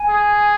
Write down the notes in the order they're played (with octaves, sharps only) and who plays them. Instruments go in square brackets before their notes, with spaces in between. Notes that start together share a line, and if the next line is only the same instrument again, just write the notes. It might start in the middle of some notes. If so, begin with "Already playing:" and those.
Already playing: [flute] G#5
[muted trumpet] G#4